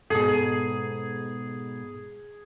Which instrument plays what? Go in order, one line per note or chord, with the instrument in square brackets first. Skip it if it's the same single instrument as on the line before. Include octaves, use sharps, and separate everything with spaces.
[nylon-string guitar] G#2 B2 A4 [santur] G#4